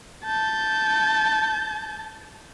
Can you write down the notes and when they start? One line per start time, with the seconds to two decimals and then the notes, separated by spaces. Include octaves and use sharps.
0.25 A5 G6